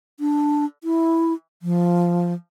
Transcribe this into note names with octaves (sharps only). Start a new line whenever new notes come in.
D4
E4
F3